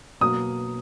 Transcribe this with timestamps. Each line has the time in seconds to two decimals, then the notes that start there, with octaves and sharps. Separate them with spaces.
0.21 B2 F#3 A#3 D#6